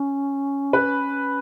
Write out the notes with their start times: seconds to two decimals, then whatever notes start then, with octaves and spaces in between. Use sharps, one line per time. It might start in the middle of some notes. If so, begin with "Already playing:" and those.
Already playing: C#4
0.73 B4